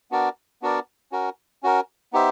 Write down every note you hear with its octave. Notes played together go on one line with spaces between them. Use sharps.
B3 D4 F#4 A#4 D5
B3 D4 F#4 A#4 D5
C#4 F#4 A#4
C#4 F#4 A#4
B3 D#4 G4 C5 E5